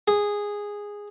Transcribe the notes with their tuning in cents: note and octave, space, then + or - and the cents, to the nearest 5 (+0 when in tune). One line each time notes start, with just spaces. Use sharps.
G#4 -10